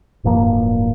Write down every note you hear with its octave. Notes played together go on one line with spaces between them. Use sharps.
D1 G2 F3 A#3